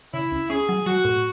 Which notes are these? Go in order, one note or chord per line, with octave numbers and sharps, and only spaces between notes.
C#3 E4
C#2
C#4 G#4
F#3
F#3 F#4
A2